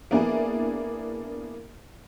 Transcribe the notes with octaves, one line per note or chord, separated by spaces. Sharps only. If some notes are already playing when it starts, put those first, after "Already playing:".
A#3 B3 D4 E4 G#4